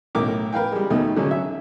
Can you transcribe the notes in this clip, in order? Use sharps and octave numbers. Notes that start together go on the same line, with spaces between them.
B1 A2 A#4 D6
A#4 B4 F5 G5
G3 G#3
D#2 B2 A3 D#4
D3 F#3 G#3 C#4 D#4
E5